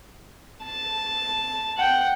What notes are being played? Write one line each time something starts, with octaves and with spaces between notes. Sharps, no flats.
A5
F#5 G5